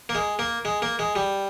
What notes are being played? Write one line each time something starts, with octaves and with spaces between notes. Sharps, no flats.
A#3
G#3
A#3
G#3
A#3
G#3
G3